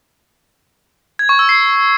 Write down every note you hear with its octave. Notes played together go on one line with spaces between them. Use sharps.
G#6
C#6
E6
C7